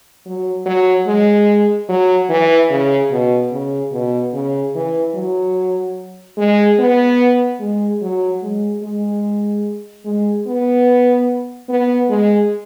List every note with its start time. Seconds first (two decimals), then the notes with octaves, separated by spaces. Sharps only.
0.25 F#3
0.66 F#3
1.07 G#3
1.89 F#3
2.29 E3
2.70 C#3
3.11 B2
3.52 C#3
3.92 B2
4.34 C#3
4.75 E3
5.15 F#3
6.37 G#3
6.79 B3
7.60 G#3
8.02 F#3
8.43 G#3
8.83 G#3
10.05 G#3
10.47 B3
11.69 B3
12.10 G#3